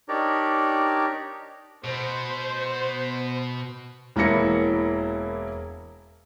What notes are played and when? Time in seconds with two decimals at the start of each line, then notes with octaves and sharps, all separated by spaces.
0.09 D4 D#4 G4 A#4 C#5 D5
1.84 B2 C5
4.16 E1 E3 A#3 E4 A#6 C#7